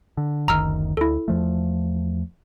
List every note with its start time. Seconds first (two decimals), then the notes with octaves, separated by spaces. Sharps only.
0.17 D3
0.48 F#1 D2 D#3 A#5 E6 F6
0.97 D2 E4 A4
1.28 E2 F3 A3